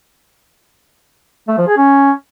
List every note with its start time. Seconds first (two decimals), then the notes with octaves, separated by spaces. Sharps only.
1.48 A3
1.58 F3
1.68 G#4
1.77 C#4